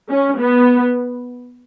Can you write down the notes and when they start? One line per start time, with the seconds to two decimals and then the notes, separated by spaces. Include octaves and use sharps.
0.10 C#4
0.39 B3